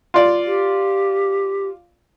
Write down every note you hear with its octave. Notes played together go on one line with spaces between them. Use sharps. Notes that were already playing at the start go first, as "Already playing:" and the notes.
F4 D5
G4